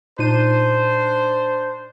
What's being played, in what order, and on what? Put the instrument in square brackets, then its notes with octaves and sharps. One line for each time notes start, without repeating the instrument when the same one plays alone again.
[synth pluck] A#2 D#4 D#7 [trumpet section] D4 C5